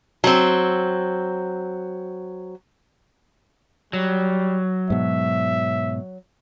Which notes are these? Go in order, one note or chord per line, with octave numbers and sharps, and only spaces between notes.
F#3 C4
F#3 G3
G#2 B2 E5